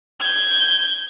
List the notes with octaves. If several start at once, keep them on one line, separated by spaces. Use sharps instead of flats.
G6 G#6